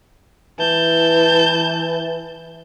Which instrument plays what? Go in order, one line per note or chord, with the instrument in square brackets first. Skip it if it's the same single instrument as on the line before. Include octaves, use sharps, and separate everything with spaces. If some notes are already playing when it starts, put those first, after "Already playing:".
[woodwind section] E3 [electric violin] A5 G6